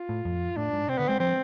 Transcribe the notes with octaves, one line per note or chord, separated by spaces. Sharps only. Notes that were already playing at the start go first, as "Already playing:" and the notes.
Already playing: F4
A2
F2
A2 D4
G#2
C3 C4
D3 B3
G#3 C4
F3 C4